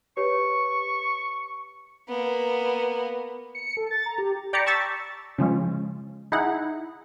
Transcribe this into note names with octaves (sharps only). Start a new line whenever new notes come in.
G4 B4 C#5 C#6
A#3 B3
C#7
A4
A6
A#5
G4
D5 G5 A#5 B5 D6 C#7
A5 C#6 E6 A6 B6
C#3 F3 G#3 C#4
D#4 E4 G#4 F#5